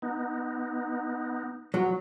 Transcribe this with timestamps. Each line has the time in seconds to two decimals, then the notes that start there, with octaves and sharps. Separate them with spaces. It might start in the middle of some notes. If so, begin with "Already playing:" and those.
0.02 B3 D#4
1.74 F#3